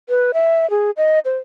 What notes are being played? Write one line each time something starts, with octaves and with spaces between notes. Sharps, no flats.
B4
E5
G#4
D#5
C5